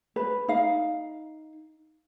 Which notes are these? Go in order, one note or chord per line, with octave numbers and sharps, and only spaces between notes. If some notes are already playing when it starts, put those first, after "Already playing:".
B4
D#4 F5